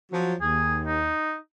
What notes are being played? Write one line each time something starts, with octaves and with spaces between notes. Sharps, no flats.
F3 F#3
D#2 G#4
D#4